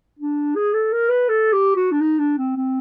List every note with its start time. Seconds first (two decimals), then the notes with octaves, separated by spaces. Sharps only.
0.19 D4
0.55 G#4
0.73 A4
0.92 A#4
1.09 B4
1.29 A4
1.52 G4
1.76 F#4
1.91 D4
2.00 D#4
2.19 D4
2.37 C4
2.56 C4